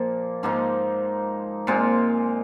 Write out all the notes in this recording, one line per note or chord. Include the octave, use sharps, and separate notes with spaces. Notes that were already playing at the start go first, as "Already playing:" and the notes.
Already playing: A#2 F3 A#3
G#2 F3 A#3 D#4
A#2 G#3 C4 F4